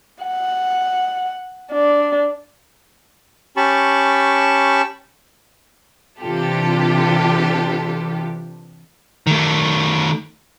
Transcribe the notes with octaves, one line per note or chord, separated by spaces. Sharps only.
F#5
D4
C#4 G4 A5 B5 C#6
C3 E3 D4 F4 G4 A4
D#3 A3